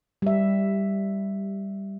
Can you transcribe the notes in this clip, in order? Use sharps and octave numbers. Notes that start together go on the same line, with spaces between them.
G3 E5